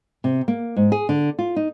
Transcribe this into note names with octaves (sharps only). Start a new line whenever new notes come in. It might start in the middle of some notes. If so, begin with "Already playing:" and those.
C3
A#3
G#2
G#4
D3
F4
D#4